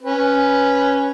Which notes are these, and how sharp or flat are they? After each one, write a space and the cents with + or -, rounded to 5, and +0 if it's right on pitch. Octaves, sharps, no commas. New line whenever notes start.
C#4 +0 B4 -10